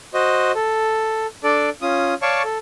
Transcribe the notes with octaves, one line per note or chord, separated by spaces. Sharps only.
F#4 C5 D#5
A4
D4 A4 D5
C#4 F4 D#6
C#5 D5 F5 A5 C#6
A4